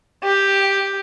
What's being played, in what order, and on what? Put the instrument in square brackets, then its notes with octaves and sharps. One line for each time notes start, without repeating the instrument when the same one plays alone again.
[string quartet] G4